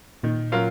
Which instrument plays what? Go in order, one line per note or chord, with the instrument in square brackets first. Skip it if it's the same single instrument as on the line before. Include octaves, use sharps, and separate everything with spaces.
[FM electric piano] A#2 [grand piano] D#3
[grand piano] F#3 C#4 F4 A#4